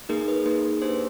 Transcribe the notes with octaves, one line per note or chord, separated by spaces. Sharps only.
A#3 D#4 G#4 A#4
B4
A#3 D#4 G#4 B4
A#3 D4 G4 C5